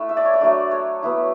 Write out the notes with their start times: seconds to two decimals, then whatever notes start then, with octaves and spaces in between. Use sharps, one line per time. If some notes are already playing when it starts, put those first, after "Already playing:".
Already playing: A3 E4 F#5
0.09 E5
0.17 D5
0.25 C#5
0.34 D5
0.40 F#3 A3 D4
0.71 C#5
1.03 F#3 B3 E4